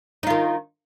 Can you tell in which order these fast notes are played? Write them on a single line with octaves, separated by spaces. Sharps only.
D#4 F4 D#3